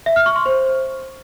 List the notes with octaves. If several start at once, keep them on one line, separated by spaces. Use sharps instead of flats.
E5
F6
C#6
C6
C5